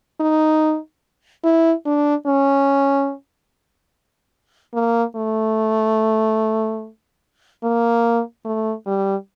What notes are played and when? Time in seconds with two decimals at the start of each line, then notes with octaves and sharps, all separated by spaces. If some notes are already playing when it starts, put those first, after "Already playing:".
0.20 D#4
1.44 E4
1.86 D4
2.27 C#4
4.74 A#3
5.16 A3
7.64 A#3
8.45 A3
8.87 G3